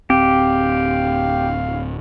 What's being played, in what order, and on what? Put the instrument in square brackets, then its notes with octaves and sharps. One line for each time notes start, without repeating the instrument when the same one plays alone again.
[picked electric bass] D1 C4 [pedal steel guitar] G4 [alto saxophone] F5